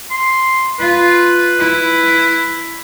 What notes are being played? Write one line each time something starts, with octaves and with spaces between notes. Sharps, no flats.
C6
F4 B4
E4